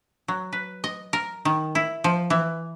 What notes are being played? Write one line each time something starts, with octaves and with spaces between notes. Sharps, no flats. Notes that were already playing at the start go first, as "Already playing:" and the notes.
F#3
B4
D#5
A#4
D#3
E4
F3
E3